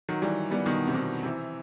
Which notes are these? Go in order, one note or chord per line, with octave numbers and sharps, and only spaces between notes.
D#3 F#3
E3 G3
G3 B3
B2 D#3
C3
B2 D#3
C3 E3